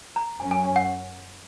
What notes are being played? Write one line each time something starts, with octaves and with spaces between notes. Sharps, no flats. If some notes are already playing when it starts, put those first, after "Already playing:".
A#5
F#2 F#3 C#4 G#5
G#5
G#5
F#5